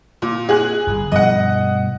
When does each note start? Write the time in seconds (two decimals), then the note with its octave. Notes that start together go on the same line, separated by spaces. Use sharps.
0.22 A#2
0.49 G#4 F#6
0.87 G1
1.12 G2 B2 F3 D#5 F#5